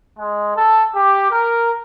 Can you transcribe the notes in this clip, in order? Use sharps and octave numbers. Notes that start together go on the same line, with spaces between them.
G#3
A4
G4
A#4